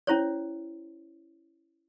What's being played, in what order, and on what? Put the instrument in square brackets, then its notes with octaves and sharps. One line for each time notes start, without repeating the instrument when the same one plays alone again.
[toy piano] C#4 E4 C5 C#5